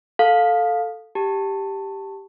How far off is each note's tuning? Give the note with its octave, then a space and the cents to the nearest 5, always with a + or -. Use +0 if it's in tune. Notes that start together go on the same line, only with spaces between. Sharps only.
A4 +0 F5 +15
G4 +0 A5 +15